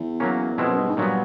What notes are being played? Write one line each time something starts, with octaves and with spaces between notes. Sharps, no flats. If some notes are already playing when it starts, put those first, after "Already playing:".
Already playing: E2
F#3 A#3 C#4
F2 B2 G#3 C4 E4
F#2
G2
G#2
G2 A#2 F#3 B3